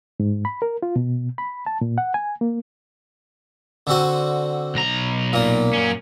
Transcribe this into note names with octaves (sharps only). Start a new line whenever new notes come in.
G#2
B5
A#4
F4
B2
B5
A5
A#2
F#5
G#5
A#3
D3 C4 F#4
B1 A#5
A#2 A#3
F#2 C#4